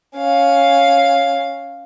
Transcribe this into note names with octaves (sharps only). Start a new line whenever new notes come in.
C#4 F5